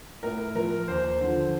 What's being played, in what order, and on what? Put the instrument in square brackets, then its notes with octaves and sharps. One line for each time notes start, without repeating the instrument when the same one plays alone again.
[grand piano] A2 A#4
F3 A#4
D#2 C5
D3 F3